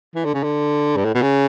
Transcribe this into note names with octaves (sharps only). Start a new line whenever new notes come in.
E3
D3
C#3
D3
G2
A2
B2
C#3